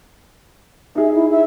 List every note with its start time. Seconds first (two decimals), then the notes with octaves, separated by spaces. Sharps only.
0.95 D#4 G#4 E5
1.14 E4
1.31 E5